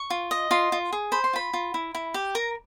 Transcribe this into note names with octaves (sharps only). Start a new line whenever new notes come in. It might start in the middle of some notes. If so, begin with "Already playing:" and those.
Already playing: C#6
F4
D#5
F4 C6
F4
G#4
C5 B5
C6
F4 B5
F4
E4
E4
G4
A#4 A#5